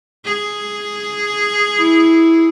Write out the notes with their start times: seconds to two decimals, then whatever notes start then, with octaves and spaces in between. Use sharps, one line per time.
0.25 G#4
1.78 E4